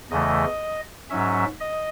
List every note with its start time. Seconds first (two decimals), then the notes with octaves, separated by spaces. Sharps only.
0.10 E2 C#3 E3 A3 D#5
1.10 G#2 F#3 C#4 E5
1.60 D#5